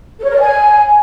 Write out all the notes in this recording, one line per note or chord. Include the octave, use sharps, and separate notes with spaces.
A4
C#5
A#4
D5
G#5